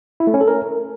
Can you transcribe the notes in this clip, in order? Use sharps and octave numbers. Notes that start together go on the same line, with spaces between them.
E4
A3
C#4
A4
A#4